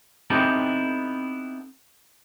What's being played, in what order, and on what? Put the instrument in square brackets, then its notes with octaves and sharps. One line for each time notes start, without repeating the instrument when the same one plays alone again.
[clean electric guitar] B3 C4 D#4 E4 G4 A4